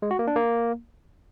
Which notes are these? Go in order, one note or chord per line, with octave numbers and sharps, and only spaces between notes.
G#3
F#4
A#3
D4
A#3